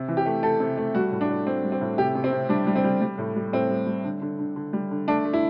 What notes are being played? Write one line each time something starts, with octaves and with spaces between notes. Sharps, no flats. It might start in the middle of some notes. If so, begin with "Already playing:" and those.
Already playing: C3
E3
G4
A3
A3 A4
C3
A3
G3 F#4
A2
D4
A2
G3 C4
G3
C4
A2
C3 G4
C3
C4
C3
G3 D4
G3
C4
G3
G3
A2
G3
A2 C4
G3
G3
D3
D3
D3
D3
G3
D3
A3 D4
A3
E4